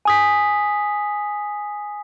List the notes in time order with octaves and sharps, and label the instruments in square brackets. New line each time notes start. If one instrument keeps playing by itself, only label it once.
[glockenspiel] G#5 D#6 B6